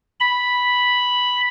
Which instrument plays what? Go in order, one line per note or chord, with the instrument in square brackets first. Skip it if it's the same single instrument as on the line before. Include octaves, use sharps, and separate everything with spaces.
[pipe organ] B5